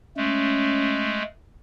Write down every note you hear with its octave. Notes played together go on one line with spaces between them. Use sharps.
G#3 A3 C#4